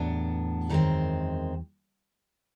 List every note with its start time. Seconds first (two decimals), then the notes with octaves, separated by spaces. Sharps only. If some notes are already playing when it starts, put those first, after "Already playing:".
Already playing: E2 A2 F#3 B3 D4
0.69 F#2 D#3 G#3 C4